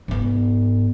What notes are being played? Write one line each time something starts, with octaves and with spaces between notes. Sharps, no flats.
G#2 B3